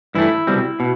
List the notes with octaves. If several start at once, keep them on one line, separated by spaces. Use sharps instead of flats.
G2 E3 A3 E4
C2 B2 G3 C4
B2